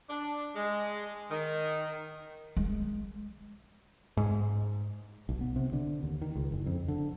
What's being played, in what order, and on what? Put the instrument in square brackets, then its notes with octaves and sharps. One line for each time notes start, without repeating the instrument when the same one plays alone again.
[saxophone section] D4
G#3
D#3
[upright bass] G#3
[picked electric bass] G#2
[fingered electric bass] B1
B3
C3
D3
D#2
D#3
C#2
F#1
F2
D3